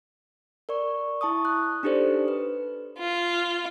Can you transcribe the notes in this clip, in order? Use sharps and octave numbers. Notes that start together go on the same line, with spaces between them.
A#4 D5 C#6
E4 A5 C#6 D#6
F#6
D4 D#4 G4 A4 C5 D5
B4
F4